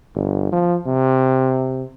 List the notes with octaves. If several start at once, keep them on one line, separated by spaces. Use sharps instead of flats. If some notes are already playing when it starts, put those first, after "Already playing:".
G1
F3
C3